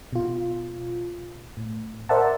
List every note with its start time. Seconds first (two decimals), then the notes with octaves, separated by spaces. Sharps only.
0.13 B2 F4
1.57 A2
2.09 A#4 C5 D5 E5 F#5 A5